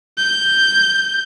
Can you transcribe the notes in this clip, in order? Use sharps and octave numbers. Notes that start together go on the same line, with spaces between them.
G6